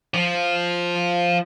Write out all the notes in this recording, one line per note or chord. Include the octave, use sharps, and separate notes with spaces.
F3